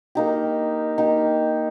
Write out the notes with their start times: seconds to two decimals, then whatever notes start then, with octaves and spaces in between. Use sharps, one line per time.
0.15 A#3 D#4 G4
0.98 A#3 D#4 G4